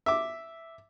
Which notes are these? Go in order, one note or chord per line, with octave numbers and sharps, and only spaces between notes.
E5 D6